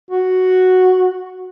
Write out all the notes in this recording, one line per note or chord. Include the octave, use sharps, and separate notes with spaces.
F#4